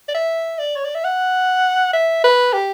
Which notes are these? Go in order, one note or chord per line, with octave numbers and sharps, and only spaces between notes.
D5
E5
D5
C#5
D5
E5
F#5
E5
B4
G4